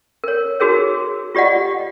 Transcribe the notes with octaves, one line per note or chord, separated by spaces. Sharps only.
A#4 C#5
D#4 F#4 G#4 A#4 C#5
F4 G4 D5 D#5 F#5